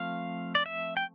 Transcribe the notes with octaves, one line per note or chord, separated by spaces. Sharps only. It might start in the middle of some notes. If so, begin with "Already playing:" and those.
Already playing: F3 A3 C4 F5
D5
E5
G5